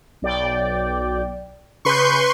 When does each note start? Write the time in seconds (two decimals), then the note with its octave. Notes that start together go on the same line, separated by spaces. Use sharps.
0.22 B1 D5 G5
1.85 C#3 B4 C6 C#6 G6